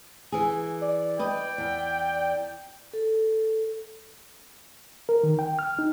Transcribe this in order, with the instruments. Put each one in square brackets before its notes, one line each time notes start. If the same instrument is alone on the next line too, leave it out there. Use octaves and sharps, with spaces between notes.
[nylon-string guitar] E3 G#4
[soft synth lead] D5
[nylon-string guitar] B4 D#5 [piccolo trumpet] G5
[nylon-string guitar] E2
[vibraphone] A4
[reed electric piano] A#4
D#3
G5
F6
D#4